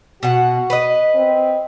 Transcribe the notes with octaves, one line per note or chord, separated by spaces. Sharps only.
B2 F#4 F#5
B4 D#5
C4